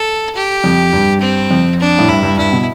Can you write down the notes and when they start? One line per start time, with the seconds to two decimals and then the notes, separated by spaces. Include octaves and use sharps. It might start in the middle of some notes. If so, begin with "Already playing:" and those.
Already playing: A4
0.35 G4
0.64 F2
0.93 G2
1.21 C4
1.51 F2
1.80 D4
1.99 A2
2.08 G2 E4
2.23 G2
2.38 G2 E4
2.52 B2